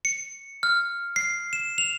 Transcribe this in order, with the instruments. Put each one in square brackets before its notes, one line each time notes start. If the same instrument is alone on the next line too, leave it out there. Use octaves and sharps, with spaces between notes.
[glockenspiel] C#7
F6
C7
E7
F7